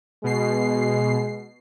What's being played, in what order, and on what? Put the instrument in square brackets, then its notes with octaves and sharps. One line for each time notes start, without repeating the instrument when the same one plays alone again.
[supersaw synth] B2 C7 [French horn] G#3